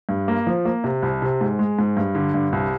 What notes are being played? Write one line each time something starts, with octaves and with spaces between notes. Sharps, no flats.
G2
A#3
F3
A#3
C3
C2
C3
G#2
G#3
G#2
G2
D3
G2
C2